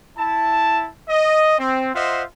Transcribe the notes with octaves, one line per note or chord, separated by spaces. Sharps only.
E4 A5
D#5
C4
F4 C5 D#5 E5 F#5